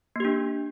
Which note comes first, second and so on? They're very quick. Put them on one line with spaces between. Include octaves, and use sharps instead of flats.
A#3 G4 D4